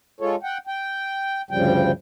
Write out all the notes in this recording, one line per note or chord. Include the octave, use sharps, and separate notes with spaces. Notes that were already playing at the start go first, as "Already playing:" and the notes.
G#3 F4 A4 C#5
F#5 G5
G5
D2 G2 C#3 F3 G3 G5